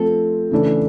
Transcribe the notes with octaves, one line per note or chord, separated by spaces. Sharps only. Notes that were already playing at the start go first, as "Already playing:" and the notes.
Already playing: F3 A3 C4 A4
C#3 E3 A3 D4